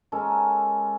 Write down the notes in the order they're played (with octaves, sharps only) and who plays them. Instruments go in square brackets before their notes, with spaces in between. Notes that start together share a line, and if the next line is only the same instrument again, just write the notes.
[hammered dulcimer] G#3 C#4 A4 A#4